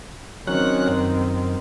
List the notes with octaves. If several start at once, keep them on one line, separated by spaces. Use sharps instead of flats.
D#3 F#3 C4 C#4 F#6
F#2